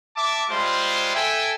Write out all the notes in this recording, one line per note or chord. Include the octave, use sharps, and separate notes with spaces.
E5 A5 D6
G3 G#3 F4 C5
A4 E5 G5 G#5